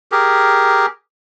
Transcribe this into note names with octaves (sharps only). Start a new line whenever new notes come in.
G4 G#4 A#4